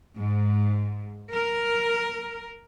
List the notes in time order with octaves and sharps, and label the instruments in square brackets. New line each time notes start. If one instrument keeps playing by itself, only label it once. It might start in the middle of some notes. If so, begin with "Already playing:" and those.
[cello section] G#2
A#4